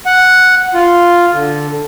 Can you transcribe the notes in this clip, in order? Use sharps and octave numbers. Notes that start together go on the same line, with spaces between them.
F#5
F4
D3